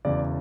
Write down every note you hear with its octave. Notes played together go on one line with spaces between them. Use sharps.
E1 E2 C#3 D5